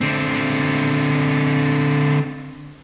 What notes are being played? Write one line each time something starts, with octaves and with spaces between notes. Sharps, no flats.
D3 C4